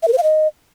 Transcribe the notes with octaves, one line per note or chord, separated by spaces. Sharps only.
E5
A#4
C5
F5
D#5